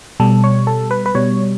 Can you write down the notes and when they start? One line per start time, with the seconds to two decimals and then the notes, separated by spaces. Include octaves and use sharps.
0.20 B2 G3 A4
0.44 C#5
0.67 A4
0.91 B4
1.06 B4
1.15 B2 G3 C#5